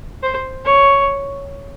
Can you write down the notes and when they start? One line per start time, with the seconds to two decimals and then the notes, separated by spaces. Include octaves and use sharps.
0.23 C5
0.65 C#5